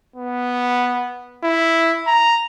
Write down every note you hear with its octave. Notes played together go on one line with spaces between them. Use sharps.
B3
E4
A#5